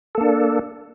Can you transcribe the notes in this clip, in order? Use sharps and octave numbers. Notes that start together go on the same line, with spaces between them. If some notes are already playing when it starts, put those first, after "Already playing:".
A#3 D4 A4